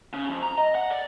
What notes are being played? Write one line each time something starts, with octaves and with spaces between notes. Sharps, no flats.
C#3
F2
A#5
D#5
F#5
D5